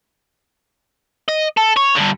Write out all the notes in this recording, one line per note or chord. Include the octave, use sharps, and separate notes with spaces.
D#5
A4
C#5
G2 D3